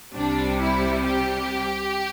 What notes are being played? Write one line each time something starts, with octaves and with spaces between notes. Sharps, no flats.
C2 C3 G3 D4
E4
G4